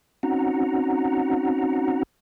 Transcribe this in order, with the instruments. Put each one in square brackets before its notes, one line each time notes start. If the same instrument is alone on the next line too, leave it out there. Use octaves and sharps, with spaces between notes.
[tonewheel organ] C4 C#4 D#4 F#4 F#5 A#5